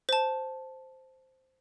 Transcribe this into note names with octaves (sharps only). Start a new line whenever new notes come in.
C5 A5